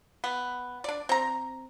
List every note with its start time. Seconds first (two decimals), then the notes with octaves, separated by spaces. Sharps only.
0.24 B3
0.84 D4 D5
1.09 C4 A#5